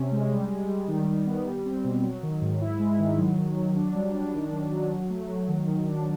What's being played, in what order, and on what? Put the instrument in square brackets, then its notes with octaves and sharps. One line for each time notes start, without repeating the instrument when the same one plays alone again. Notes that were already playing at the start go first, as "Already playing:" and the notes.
Already playing: [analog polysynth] C3 C#4
G#3
G3
G3
G3
D#3
D#3
B3
G3
C4
B2
F#3
D#3
G#2
E4
G#3
D#3
F#3
F#3
F#3
D4
G3
D4
D#3
F#3
F#3
F#3
A3
F#3
D#3
D#3
D4